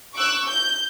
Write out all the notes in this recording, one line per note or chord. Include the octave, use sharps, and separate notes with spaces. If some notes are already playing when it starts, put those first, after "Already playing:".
C#6 D6 E6 F#6
G6